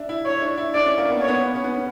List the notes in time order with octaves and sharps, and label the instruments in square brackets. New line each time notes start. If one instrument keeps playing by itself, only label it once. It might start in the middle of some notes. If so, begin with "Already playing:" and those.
Already playing: [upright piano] D4 E5
E4
[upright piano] E4 [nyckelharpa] C#5
[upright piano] D4
E4
[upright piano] D4 [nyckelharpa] D5
[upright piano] C#4
A#3
B3
[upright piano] C#4 [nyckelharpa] C#5
[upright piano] B3
C#4
B3
C#4
B3
C#4